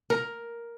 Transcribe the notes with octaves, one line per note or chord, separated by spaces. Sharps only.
A#4